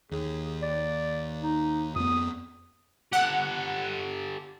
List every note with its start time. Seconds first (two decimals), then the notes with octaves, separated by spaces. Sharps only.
0.11 D#2 G#4
0.63 D5
1.43 D#4
1.96 F2 B3 D#6
3.13 G4 A4 F#5